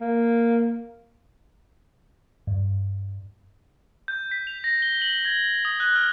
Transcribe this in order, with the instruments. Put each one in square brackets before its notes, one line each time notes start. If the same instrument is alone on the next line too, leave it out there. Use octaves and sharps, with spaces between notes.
[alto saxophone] A#3
[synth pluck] G2
[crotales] G6
B6
F7
A#6
G7
F#7
G#6
D#6
F#6
F6